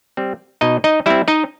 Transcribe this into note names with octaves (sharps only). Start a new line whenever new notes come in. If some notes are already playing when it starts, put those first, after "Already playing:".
G3 C4
B2 D#4 D#5
D#4 D#5
G3 C4 E4 E5
D#4 D#5